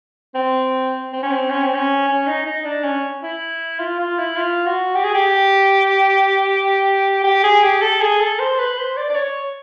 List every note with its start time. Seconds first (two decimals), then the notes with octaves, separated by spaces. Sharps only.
0.35 C4
1.12 C4
1.23 C#4
1.31 C4
1.50 C#4
1.62 C4
1.74 C#4
2.08 C#4
2.27 D#4
2.46 D#4
2.64 D4
2.84 C#4
3.23 E4
3.79 F4
3.98 F4
4.18 E4
4.36 F4
4.66 F#4
4.95 G4
5.04 G#4
5.14 G4
7.24 G4
7.43 G#4
7.63 G4
7.81 A4
8.01 G#4
8.20 A4
8.39 C5
8.59 B4
8.78 C5
8.97 D5
9.09 D5
9.15 C#5